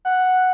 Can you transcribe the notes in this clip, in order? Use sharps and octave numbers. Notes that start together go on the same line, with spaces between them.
F#5